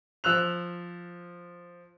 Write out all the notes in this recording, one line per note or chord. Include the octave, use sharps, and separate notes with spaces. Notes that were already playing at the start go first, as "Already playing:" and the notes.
F3 E6 F#6 F7